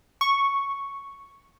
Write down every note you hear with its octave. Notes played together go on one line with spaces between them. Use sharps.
C#6